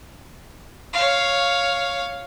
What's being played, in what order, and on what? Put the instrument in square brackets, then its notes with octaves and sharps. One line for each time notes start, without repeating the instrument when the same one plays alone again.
[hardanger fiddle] C#5 F5